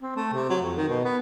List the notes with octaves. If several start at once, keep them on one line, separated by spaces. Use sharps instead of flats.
C4
A3
C3
F#3
F2
D#3
B2
B3